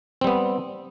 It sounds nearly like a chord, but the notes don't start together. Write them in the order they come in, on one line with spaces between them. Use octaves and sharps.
C4 G3 B3